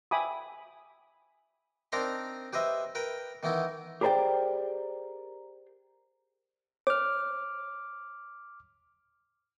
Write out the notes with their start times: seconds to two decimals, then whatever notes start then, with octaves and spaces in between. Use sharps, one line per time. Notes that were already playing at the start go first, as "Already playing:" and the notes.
0.11 E5 G5 G#5 B5 D6 D#6
1.92 C4 D4 D#4 A#4 A#5 C6
2.53 G4 B4 C5 D#5 E5
2.95 A#4 B4 G5
3.43 D#3 E3 B3 D#4 E4
4.01 G4 G#4 A#4 C5 D5 G5
6.87 C#5 D6 F6